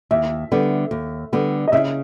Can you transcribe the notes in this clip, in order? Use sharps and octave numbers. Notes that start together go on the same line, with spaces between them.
D#2 E5
D3 G3 B3
D#2
D3 G3 B3
D#5
C#3 E5